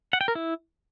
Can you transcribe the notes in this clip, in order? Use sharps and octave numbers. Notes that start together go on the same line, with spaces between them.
F#5
G5
A#4
E4